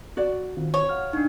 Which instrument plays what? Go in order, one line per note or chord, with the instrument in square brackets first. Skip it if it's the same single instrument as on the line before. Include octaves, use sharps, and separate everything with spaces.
[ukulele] F#4 D5
[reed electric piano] D#3 C4 F4
[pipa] C#5
[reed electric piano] F5 F#5 F6
[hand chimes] D4 D#4